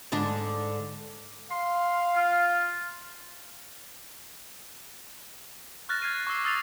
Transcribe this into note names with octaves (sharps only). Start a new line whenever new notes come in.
G#2 D3 D4
F5 C6
F4
C#6 F6 F#6 A6 A#6
F6 G#6 A6 C7 D#7
C#6 D6 E6 C7
D#6 E6 A6 C7 F7